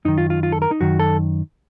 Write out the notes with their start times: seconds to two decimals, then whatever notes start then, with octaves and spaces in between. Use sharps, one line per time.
0.05 F#2 D#3 D#4
0.18 F4
0.30 F4
0.43 F4
0.52 A4
0.62 A#4
0.71 D#4
0.81 F#2 D#3 F#4
0.99 A4